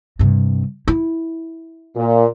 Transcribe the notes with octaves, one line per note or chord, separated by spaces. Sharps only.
G2 C3
E4
A#2